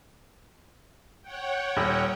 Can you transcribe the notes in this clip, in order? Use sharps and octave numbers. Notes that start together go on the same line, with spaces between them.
C#5 F#5 G5
D#1